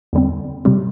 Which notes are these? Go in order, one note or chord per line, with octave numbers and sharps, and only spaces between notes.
E2 D3 G3 C4
C3 G3 C4